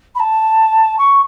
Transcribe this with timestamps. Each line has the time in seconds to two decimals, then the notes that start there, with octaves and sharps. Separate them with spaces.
0.15 B5
0.19 A5
0.98 C#6